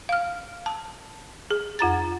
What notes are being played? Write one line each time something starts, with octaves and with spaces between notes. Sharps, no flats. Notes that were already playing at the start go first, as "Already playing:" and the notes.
F5 F6
A5
G#4
F2 F4 A#5 A6